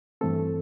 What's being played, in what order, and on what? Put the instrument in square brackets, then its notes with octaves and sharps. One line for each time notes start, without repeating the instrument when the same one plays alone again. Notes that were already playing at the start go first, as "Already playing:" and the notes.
[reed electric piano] G2 E3 A3 C4 A4